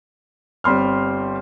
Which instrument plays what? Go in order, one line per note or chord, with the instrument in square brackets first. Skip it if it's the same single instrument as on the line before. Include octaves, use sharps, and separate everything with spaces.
[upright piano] G1 G3 C4 C6 F6